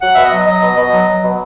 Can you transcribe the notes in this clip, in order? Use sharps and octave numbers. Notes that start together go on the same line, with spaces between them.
F#3 F#5
B2 E5
D#5
F#3
F#3 D#5
B2
B2
F#3
F#3
B2